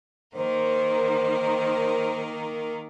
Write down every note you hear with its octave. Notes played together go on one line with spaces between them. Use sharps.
D#3 A#3 A#4 C5